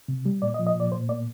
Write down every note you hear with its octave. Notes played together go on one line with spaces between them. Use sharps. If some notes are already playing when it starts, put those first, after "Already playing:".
C3
G3
A#2 D5
D#5
F3
D#5
A#2 D5
A#2 C5
A#3 D5